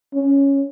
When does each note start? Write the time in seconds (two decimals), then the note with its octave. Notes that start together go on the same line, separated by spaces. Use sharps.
0.15 C#4